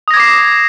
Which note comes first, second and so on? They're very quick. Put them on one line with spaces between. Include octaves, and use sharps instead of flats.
D#6 A#6 G#6 D6 C7